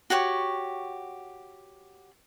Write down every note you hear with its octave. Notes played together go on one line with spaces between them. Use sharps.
F#4 G4 C#5 C#6